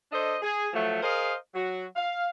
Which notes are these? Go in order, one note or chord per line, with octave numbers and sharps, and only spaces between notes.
D4 A4 C5 D#5
G#4
F3 F#3 A3
G#4 A#4 C5 D#5 F5
F#3 F#4
F5